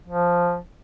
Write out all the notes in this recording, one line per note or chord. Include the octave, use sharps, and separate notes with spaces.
F3